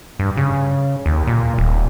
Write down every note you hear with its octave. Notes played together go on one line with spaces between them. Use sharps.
G2
C#3
D#2
A#2
D#1